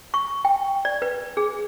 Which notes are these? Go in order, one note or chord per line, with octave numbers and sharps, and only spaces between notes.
C#6
G5
D5
B4
G#4